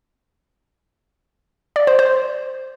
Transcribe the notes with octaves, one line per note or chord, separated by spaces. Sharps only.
D5
C5
C5